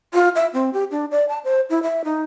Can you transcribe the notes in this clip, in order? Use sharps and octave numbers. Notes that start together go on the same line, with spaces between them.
F4
E5
C4
G4
D4
D5
A5
C5
E4
E5
D#4